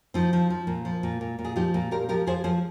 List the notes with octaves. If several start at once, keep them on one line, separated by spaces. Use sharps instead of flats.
F3 C4 D#4
F3
F3
A#2
F3
A#2
A#2
A#2
G#4
F3 D#4 G4
A#2
A#2 G4 A#4
F3 G4 A#4
F3 G#4 C5
F3 G#4 C5